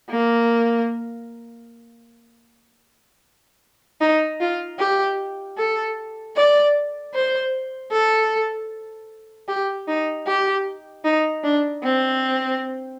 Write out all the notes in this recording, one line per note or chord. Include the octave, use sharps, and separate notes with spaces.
A#3
D#4
F4
G4
A4
D5
C5
A4
G4
D#4
G4
D#4
D4
C4